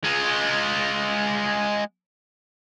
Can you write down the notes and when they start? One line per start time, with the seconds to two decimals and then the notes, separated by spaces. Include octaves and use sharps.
0.04 G#3 F4